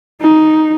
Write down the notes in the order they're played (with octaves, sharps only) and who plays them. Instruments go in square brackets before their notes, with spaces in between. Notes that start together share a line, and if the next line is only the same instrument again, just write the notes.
[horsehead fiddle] D#4